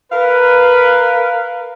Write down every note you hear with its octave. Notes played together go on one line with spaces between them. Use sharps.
A#4 B4 F5